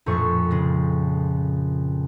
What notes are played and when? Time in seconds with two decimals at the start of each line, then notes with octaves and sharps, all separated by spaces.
0.06 A#1 F2 A2 C#6
0.51 C#3 G#3